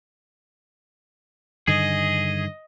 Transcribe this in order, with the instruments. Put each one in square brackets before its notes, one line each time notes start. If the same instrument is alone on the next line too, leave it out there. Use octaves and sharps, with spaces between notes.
[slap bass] G2 D3 D#3 [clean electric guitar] G#4 [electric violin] D#5